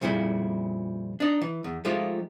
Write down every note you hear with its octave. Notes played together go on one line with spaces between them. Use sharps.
F2 A#2 C#3 G3 E4
D4 D#4
E3
E2
F3 G#3 A3 D#4 F4 G4